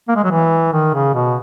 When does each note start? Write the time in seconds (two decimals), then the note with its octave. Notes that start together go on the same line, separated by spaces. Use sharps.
0.09 A#3
0.16 G#3
0.24 F#3
0.31 E3
0.73 D#3
0.94 C#3
1.14 B2